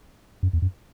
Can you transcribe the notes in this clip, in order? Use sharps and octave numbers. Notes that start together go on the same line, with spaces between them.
F#2
E2
F#2